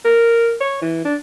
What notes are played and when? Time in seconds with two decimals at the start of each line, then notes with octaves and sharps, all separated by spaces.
0.04 A#4
0.60 C#5
0.81 E3
1.05 D4